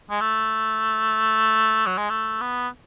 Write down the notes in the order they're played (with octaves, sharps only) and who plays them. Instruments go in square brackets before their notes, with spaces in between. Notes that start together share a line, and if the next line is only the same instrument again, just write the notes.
[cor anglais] G#3
A3
F#3
G#3
A3
B3